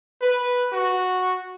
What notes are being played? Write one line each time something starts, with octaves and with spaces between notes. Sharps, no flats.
B4
F#4